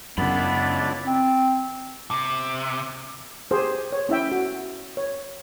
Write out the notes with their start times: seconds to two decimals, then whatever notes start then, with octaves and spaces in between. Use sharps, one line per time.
0.18 C#2 F#2 C#3 B3 D4 E4 B5 A6
1.06 C4
2.11 C3
3.51 G4 G#4 C5
3.92 C#5
4.09 C#4 E4 E5 G5
4.32 F#4
4.97 C#5